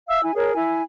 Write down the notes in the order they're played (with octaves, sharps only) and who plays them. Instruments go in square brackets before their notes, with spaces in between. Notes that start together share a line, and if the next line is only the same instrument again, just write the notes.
[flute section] E5 F5 E6
E4 G#5
G#4 A#4 C#5
E4 G#5